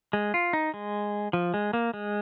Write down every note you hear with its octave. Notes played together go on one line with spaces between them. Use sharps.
G#3
F4
D#4
G#3
F3
G#3
A#3
G#3